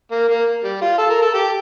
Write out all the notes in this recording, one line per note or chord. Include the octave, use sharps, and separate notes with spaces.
A#3
A#3
G3
F4
A4
A#4
A4
G4